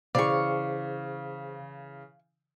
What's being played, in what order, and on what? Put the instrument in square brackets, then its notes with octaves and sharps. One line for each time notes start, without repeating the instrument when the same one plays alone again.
[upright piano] C#3 E3 [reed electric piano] G#4 C5 [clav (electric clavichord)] D5 [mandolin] F5 C#6